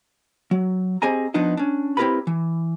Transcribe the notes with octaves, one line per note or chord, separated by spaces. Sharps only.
F#3
C4 G4 G#4 D#5 G#5 A#5
F3 B3 D4 D#4 D#5
C#4 D4
C4 E4 G4 A#4 B4 B5
E3